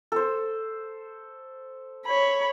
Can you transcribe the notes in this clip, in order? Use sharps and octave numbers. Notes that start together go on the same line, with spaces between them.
A4 C5
C#5 B5